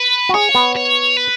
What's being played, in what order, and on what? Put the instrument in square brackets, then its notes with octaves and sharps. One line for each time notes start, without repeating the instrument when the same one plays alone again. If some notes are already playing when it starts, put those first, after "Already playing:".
Already playing: [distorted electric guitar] B4
[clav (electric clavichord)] F#4
[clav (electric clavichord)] G#4 [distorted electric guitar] C#5
[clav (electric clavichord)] B3
[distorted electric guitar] C#5
B4